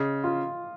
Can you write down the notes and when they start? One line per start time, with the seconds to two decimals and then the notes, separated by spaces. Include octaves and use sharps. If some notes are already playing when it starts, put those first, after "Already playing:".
Already playing: C#3 D#5
0.24 F4